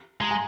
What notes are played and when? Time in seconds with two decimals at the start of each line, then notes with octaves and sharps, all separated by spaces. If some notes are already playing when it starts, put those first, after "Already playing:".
0.20 G#3 A#5
0.31 G#5